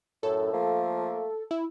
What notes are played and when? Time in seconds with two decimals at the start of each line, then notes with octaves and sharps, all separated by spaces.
0.23 F#2 A2 A4
0.53 F3 A3 A#3
1.51 E4